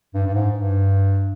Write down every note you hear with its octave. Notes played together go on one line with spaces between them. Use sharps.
G2
G2
G#2
G2